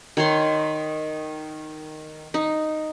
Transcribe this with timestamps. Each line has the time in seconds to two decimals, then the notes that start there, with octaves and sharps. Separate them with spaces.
0.17 D#3 C#5 C6
2.34 D#4